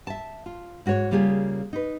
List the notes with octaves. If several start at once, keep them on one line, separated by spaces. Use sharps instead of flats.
E5 A5
F4
G#2 F#4 A#4 C#5
C#3 G3 A#3 F4 G4 G#4
D#4 B4